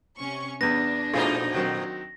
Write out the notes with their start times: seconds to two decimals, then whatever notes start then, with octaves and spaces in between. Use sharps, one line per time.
0.18 C3 C#4 C#6
0.61 E2 B3 D4 A#6
1.13 F2 A#2 A3 D#4 F4 G#4
1.54 D#3 F#3 C4